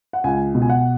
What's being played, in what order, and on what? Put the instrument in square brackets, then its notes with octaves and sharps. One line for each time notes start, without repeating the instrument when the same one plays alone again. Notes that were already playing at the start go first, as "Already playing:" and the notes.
[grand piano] F#5
C#2 G#5
B2
G#5
F#5